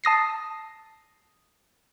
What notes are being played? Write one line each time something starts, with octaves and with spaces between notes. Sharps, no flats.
A5 D#6 A#6 C7